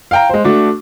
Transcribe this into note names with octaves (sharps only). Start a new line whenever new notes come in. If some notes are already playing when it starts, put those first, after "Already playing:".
F5 G5 A#5
G#3 C5
A3 D4 F#4